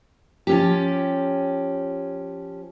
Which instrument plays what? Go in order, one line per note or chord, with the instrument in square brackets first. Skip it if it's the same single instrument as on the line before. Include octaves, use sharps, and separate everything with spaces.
[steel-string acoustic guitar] F3 C#4 G4